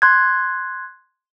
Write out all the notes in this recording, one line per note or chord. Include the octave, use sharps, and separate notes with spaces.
C6 F#6 G#6